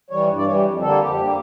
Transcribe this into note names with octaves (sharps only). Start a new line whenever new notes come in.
E3 G3 C#5
G2
D5
E3 G3 C#5
G4
F2
D3 G3 A#3 A4
F2 G4
D3 G3 A#3